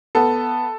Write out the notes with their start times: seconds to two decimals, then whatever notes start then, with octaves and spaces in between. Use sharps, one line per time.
0.15 B3 A4